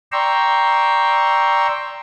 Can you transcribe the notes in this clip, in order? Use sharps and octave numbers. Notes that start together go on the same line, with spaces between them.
D5 G5 A#5 C6 C#6 E6